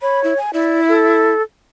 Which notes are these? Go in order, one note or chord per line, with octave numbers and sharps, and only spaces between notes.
C#5 B5
E4
G#5
E4 D5
A4